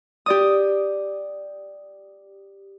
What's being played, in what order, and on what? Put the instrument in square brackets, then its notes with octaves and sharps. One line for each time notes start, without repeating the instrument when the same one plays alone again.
[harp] G4 D5 D#6